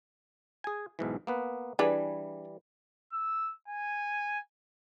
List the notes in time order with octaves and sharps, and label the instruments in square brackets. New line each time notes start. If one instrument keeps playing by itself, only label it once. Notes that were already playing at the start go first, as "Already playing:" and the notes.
[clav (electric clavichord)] G#4 G#5
B1 G#2 E3
A#3 B3 B4
[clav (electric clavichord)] E3 G3 [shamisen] D4 G#4 B4
[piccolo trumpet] E6
G#5